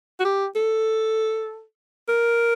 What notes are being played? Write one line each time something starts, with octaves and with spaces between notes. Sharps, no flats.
F#4
G4
A4
A#4